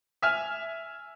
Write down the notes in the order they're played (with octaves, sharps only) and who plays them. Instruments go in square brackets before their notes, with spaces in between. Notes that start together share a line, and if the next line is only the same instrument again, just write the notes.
[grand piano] E5 G#5 F6